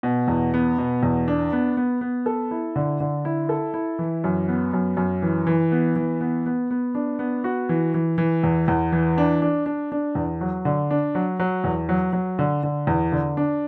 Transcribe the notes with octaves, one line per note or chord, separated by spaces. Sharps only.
B2
E2
B3
B2
E2
D4
B3
B3
B3
A4
E4
D3
D3
E4
A4
E4
E3
F#2
B3
F#2
F#2
E3
E3
B3
E3
B3
B3
B3
D4
B3
F#4
E3
E3
E3
E2
E2
E3
D4
D4
D4
D4
E2
F#3
D3
D4
F#3
F#3
E2
F#3
F#3
D3
D3
E2
D3
D4